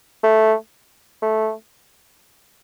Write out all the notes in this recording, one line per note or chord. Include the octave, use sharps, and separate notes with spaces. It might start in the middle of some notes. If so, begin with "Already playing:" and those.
A3
A3